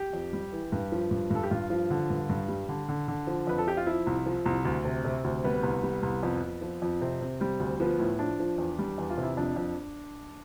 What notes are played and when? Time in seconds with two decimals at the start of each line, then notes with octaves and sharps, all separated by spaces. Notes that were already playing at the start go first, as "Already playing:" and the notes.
Already playing: G4
0.13 F2
0.33 G3
0.52 E3
0.72 G2
0.92 F3
1.11 G2
1.30 G2 A4
1.43 G4
1.51 G2 F4
1.70 F3
1.90 D3
2.10 G2
2.29 G2
2.48 G3
2.69 D3
2.88 D3
3.08 D3
3.27 F3
3.47 F2 B4
3.58 A4
3.66 F3 G4
3.77 F4
3.86 F3 E4
4.07 C2
4.26 F3
4.46 C2
4.65 D2
4.85 C3
5.04 C3
5.24 D2
5.44 G3 B3
5.63 C2
5.83 G3
6.03 C2
6.23 F2
6.42 F2
6.61 F3
6.82 F2
7.01 C3 C4
7.21 C3
7.40 G3 C4
7.60 D2
7.80 F3 B3
7.99 A2
8.19 F3 D4
8.39 F3
8.58 E2
8.79 G3
8.98 E2
9.10 F4
9.18 C3
9.23 E4
9.37 F2 D4
9.56 F2